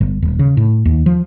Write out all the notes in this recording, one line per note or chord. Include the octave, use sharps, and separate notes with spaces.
G1
D#1
C#3
A2
D#2
F3